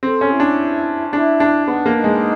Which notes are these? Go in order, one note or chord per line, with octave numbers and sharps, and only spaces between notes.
C4 A4
C#4
E4
D4
D4 E4
D4
B3 D#4
A#3
D#4
G#3